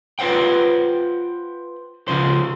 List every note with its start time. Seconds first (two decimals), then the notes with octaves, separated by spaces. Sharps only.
0.19 F4 B4 C5 F#5 G5
2.08 C#2 C#3 F3 C5